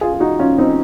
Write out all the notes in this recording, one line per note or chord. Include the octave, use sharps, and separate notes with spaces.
F4 G#4
G#4
D#4 F#4
C#4 F4
C4 D#4